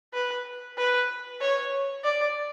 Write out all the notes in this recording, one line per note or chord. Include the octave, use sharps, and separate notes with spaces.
B4
B4
C#5
D5